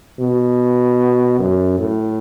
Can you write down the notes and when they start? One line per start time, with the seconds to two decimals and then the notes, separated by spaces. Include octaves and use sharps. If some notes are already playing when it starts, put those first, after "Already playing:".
0.19 B2
1.39 F#2
1.79 A2